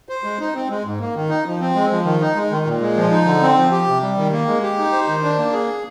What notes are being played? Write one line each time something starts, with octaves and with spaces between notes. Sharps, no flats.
C5
G#3
D#4
C4
G#3
G#2
A#3
D#3
D#4
F3
C4
G#3
F3
D#3
D#4
G#3
D#3
A#2
G#3
F3
D#4
D3
C4
F3
G4
C3
G3
D#3
A#3
G#3
G4
D#4
C5
D#3
D4
A#3
G#4